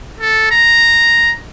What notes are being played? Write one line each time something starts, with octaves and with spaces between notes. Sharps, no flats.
A4
A#5